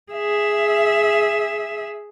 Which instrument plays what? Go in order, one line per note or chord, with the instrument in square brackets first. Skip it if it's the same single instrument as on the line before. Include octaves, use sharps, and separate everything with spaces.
[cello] G#4 E5